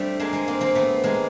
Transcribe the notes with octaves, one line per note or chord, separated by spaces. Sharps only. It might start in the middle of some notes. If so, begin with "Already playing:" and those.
Already playing: G3 A3 C4 D4
G#3 A#3
G#3 A#3
A#3 C4
A#3 C4
A3 B3
G#3 A#3